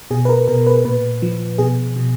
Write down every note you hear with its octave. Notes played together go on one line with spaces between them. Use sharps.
B2 G#4
B4
A#4
B2 A#4
B4
A#2 B4
F3
B2 G#4
B2